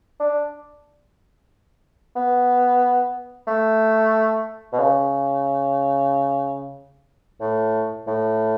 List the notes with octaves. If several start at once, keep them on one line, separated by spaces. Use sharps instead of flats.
D4
B3
A3
B2
C#3
A2
A2